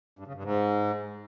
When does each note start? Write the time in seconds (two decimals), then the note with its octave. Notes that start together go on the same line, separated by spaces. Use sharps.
0.19 G2
0.27 C#3
0.35 G2
0.43 G#2